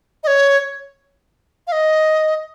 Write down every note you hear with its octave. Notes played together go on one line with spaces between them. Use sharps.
D#5
C#5
F5
D#5